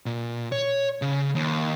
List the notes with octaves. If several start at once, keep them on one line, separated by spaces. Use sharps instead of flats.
A#2
C#5
C#3
D#2